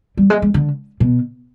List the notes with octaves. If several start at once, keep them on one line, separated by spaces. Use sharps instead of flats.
G3
G#3
G#3
D3
B2